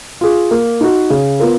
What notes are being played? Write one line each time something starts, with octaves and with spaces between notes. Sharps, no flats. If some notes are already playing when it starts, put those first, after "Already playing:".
F4 G#4
A#3
D#4 F#4
C#3
B3 F4 A#4